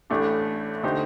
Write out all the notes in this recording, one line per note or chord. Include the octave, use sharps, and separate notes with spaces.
A1 A2 A3 D4 G4
D3 A3 D#4 G4 C5